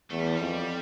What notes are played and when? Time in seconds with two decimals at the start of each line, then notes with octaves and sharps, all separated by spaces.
0.11 E2 A3
0.19 G3
0.27 F3
0.35 G3
0.40 F2